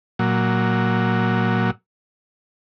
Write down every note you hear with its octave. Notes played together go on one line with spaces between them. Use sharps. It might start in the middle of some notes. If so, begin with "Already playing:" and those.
A#2 F#3